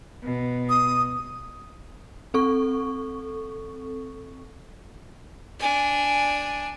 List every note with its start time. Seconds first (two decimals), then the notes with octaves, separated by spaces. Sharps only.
0.24 B2
0.70 D#6
2.34 C4 A4 C#6
5.59 D4 G#5